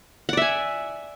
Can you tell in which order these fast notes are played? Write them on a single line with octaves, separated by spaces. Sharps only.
F#5 D5 E5 G#5